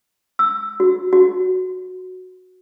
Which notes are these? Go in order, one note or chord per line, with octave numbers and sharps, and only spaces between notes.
E6
F#4
F#4